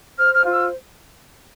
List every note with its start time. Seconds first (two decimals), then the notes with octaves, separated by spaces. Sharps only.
0.18 C5 F6
0.34 F6
0.43 F4
0.51 E6